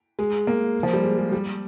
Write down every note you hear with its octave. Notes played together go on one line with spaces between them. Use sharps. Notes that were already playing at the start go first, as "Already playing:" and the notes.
G#3
A#3
F3
G3
G#3
G#3
G3